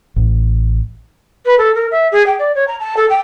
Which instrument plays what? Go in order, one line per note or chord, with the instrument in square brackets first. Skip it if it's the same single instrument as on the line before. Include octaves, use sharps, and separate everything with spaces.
[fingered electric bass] A1
[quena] B4
A4
A#4
E5
G#4
G5
D5
C#5
A#5
A5
A4
G5